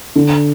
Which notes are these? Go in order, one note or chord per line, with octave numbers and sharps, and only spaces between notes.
D3